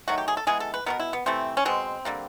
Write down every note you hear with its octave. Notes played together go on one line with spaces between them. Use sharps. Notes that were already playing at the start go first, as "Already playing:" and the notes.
D#3 F#3 A3 F#4
G4
G#4
A4
E3 G#3 B3 G#4
A4
B4
B2 G3 B3 A#4
E4
B3
C3 E3 A3 C4
C#4
B2 G#3 B3 C4
D3 G3 A#3